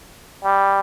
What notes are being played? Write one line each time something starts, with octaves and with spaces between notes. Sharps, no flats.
G3